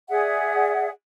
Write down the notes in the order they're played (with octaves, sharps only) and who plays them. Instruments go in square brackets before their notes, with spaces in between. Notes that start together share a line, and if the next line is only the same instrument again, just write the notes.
[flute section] G#4 D5 E5 F#5